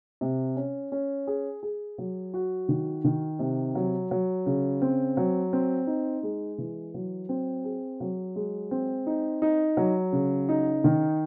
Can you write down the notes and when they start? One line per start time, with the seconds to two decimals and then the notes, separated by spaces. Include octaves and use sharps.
0.21 C3
0.56 C#4
0.92 C#4
1.27 G#4
1.63 G#4
1.98 F#3
2.34 F#4
2.69 D#3
3.04 D#3
3.39 C3
3.75 F#3
4.11 F#3
4.46 C#3
4.82 C4
5.17 F#3
5.53 C4
5.87 D#4
6.23 G#3
6.58 E3
6.94 F#3
7.29 C4
7.64 G#4
8.00 F#3
8.36 G#3
8.71 C4
9.07 D#4
9.42 D#4
9.77 F#3
10.12 C#3
10.49 D#4
10.84 D#3